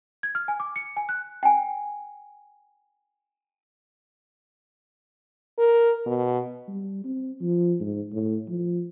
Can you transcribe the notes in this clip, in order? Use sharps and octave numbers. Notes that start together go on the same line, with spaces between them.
G#6
F6
G#5
D6
C#7
G#5
F#6
G5 G#5
A#4
B2
G3
C4
F3
G#2
A2
F3